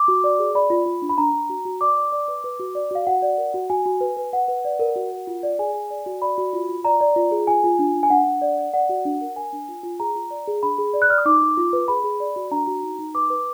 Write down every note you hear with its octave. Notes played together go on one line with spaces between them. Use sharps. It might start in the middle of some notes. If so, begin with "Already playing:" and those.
Already playing: D6
F#4
D5
G#4
D5 B5
F4
F4
D4
B5
D4 A#5
D4
F#4
F#4
D5 D6
D5
D5
B4
B4
F#4
D5
F#4 F5
F#4 F#5
D5
A#4
F#4
F#4 G#5
F#4
B4
B4
B4 F#5
B4
D5
A#4
F#4
A#4
F4
D5
G#4 G#5
G#4
D5
F#4
D5 B5
F#4
F4
F4
D5 A#5
D5
F4
G#4
F4 G#5
F4
D4
D4
G#5
D4 F#5
D4
D5
D5
D5 F#5
F#4
D4
A#4
A#4 G#5
D4
F4
F4
G#4 A#5
F4
D5
G#4
D4 B5
G#4
D5
F#6
D5 F6
D#6
D#4 D6
D#4
F4
B4
G#4 B5
G#4
D5
F#4
D4 A#5
F#4
D#4
D#4
B4 D6
B4